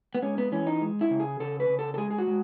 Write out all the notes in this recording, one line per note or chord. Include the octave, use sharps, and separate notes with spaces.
B3
G#3 C#4
B3
E3 C#4
D#4
G#3
E4
C#3
G#4
C#3 A4
B4
C#3
A4
A4
G#3 G#4
G#4
F#4
G#3